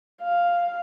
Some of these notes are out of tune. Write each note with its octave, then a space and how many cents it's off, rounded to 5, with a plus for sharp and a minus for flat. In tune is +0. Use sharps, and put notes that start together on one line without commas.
F5 +0